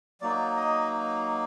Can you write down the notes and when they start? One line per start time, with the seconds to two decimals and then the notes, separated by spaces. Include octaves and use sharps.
0.21 F#3 A#3 D#4 D5
0.56 D#5